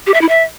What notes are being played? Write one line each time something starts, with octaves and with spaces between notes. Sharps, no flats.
G4
E5
E4
E5